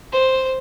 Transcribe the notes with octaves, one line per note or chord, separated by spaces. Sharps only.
C5